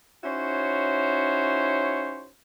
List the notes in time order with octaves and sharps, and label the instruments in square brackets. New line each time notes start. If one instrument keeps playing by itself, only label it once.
[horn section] C#4 D#4 E4 F#4 C5 C#5